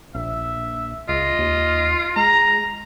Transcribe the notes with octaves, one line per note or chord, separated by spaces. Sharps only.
A#1 E5
C#2 F4 D#5
D#2
G#3 A#5